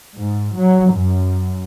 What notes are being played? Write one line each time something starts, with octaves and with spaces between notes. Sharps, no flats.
G#2
F#3
F#2